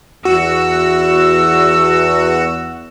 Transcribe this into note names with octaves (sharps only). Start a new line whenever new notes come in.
E2 F#4 E6